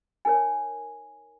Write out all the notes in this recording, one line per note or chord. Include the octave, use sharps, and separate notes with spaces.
D#4 A#4 C#5 G#5